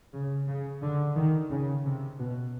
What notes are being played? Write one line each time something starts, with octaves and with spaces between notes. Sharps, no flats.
C#3
C#3
D3
D#3
C#3
C3
B2